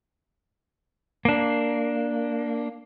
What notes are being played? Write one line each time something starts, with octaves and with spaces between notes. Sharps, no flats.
A#3 D4